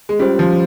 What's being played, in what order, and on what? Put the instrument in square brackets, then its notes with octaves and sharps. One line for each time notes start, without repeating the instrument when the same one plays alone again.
[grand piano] G#3
[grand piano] G3 [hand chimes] C#4 F4 C5
[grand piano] F3